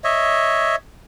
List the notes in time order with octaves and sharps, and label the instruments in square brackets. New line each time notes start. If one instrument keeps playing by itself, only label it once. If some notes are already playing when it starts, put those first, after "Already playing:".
[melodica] C#5 D#5 E5